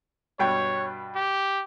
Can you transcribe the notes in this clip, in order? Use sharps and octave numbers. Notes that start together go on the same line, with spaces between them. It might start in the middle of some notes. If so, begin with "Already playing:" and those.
G2 B2 C#5 G5
G4